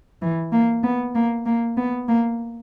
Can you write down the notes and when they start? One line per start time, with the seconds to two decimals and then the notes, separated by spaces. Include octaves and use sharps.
0.22 E3
0.52 A#3
0.83 B3
1.15 A#3
1.46 A#3
1.77 B3
2.08 A#3